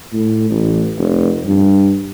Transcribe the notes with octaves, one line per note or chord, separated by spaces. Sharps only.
A2
A1
F1
G2